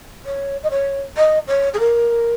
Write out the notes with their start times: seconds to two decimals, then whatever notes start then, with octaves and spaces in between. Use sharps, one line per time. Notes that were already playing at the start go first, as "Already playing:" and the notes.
0.25 C#5
0.63 D#5
0.70 C#5
1.17 D#5
1.47 C#5
1.73 G#4
1.79 A#4